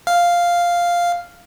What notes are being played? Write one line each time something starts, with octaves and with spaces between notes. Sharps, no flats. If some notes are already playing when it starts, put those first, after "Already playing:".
F5